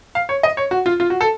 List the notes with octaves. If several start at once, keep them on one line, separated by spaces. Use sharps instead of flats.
F5
C#5
D#5
C#5
F#4
F4
F4
F#4
A4